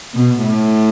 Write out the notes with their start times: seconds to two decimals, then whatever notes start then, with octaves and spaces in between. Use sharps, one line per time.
0.15 B2
0.43 A2